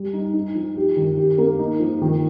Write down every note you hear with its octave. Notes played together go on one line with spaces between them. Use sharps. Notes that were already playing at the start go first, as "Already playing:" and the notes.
Already playing: G3
D#4
D#4
F3
G4
D#3
G4
A#3
D#4
F3
D#3